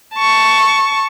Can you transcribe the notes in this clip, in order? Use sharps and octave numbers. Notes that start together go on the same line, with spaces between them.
A5 C#6